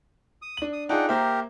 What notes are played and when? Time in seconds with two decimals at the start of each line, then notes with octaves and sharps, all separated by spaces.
0.42 D#6
0.57 D4 F#7
0.73 D#6
0.89 D4 D#4 F4 G#4 F#5 G5
1.09 A#3 G4 A#4 C5 E5